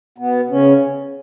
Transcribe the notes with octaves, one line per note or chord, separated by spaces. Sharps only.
B2 B3
C#3 C#4